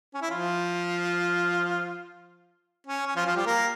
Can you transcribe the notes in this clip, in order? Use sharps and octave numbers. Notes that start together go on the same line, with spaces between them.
C#4
E4
F3 F4
C#4
C#4
F3 F4
F3 F4
G3 G4
A#3 A#4